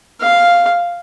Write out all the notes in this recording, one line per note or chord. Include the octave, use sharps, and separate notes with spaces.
F5